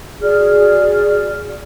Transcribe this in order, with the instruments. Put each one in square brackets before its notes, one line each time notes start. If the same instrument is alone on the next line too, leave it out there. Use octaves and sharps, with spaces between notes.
[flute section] F#4 G#4 D5 F6